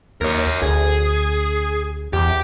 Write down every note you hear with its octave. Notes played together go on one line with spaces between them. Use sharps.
D#2 A#4 C#5
D2 G#4
E2 G4